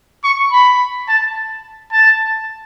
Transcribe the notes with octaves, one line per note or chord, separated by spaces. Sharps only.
C#6
B5
A5
A5